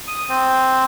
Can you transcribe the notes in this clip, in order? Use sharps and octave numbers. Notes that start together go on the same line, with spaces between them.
D#6
C4